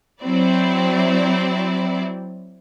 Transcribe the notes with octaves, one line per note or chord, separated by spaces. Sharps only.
F#3 C4 E4 D5